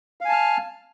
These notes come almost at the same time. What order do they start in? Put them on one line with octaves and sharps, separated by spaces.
F5 G#5 A5 F6